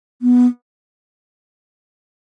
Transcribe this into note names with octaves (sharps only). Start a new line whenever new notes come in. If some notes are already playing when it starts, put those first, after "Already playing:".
B3